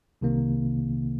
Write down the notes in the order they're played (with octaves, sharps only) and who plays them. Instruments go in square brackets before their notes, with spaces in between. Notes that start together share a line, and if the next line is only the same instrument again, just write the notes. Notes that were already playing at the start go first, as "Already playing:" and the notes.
[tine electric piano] C2 C3 D#3 A#3